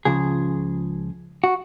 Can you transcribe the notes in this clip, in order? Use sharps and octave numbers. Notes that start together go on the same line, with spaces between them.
C#2 C#3 F3 G#4
F#4